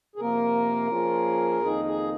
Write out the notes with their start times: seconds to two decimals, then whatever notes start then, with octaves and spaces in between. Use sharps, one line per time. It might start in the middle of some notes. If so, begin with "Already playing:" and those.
0.16 G#4
0.19 C3 F3 A#3 A#4
0.90 F3 A#3 C#4 F4 G#4
1.62 F2 D#3 A#3 D#4 G#4
1.85 G#4